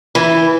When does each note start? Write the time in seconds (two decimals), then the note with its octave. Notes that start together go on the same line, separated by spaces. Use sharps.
0.15 E3